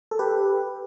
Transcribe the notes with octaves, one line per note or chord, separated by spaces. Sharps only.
A4
G4 B4